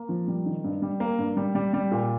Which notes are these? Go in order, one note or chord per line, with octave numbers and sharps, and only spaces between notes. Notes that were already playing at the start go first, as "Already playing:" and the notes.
Already playing: A#3
F3
G3
D#3
G2
G3
A#3
G2
G3
G3
G3
A#2